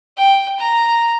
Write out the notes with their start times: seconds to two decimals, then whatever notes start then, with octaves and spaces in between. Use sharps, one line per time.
0.17 G5
0.59 A#5